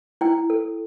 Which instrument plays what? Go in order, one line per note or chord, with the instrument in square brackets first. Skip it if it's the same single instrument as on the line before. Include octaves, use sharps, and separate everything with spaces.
[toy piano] E4 G5
A4